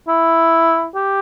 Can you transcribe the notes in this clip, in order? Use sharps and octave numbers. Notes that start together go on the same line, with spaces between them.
E4
G4